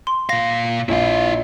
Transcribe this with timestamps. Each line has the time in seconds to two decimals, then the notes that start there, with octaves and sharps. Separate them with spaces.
0.07 C6
0.29 A#2 F5 A#6
0.89 A#1 E4 F5